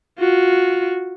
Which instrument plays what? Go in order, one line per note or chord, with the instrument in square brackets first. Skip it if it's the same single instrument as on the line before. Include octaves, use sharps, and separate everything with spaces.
[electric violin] F4 F#4